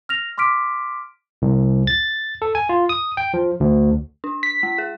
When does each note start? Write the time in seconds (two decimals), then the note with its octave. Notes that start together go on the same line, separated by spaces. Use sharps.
0.09 F6 A#6 F7
0.38 C6 D6 F6 B6 D7
1.42 C2
1.87 A6
2.42 A4
2.55 G#5
2.69 F4
2.89 D#6
3.17 G5
3.34 F3
3.60 D2
4.24 D4
4.43 B6
4.63 G#3
4.78 G#4